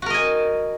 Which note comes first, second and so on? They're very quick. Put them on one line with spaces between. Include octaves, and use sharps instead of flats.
F#4 A#4 D#5 G#5